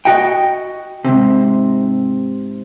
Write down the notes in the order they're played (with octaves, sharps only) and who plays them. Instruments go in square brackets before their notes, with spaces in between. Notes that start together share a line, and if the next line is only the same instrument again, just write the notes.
[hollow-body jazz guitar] F#4 D#5 G5
G#2 C3